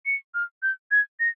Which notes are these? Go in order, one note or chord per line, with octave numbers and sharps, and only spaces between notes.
C#7
F6
G6
G#6
A#6